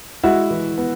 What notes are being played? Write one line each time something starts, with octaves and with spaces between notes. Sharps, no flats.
G#3 E4 F#4
E3
B3